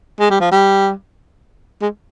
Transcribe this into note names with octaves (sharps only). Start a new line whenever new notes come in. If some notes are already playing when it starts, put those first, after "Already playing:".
G#3
G3
F3
G3
G#3